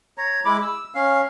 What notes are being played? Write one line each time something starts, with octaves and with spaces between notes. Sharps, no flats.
C#5 A#5
G#3 E4 B5 D6
E6
C#4 F5